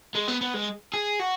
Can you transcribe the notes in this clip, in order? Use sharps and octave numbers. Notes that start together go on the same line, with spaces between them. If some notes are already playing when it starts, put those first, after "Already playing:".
G#3
B3
B3
G#3
G#4
F#4